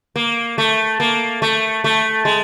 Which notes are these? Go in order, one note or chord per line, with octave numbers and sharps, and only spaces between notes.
A#3
A3
A#3
A3
A3
G#3